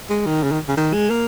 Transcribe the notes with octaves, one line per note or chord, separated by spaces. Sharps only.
G#3
D#3
C#3
D#3
C#3
D#3
G#3
A#3